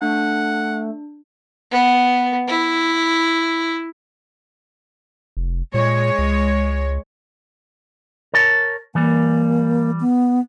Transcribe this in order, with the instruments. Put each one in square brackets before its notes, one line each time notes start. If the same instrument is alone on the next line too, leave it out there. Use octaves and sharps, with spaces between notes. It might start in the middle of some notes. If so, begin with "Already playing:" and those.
[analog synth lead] A3 [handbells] D4 [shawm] F#5
[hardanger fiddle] B3
E4
[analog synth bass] F1
[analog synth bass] A#2 [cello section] G#3 C#5
[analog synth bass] C#2
[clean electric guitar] A#4 C#5 A5
[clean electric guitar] E3 G3 [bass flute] A#3
[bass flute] B3